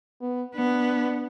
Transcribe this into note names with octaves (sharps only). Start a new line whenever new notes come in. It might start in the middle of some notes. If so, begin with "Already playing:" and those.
B3
B3 D4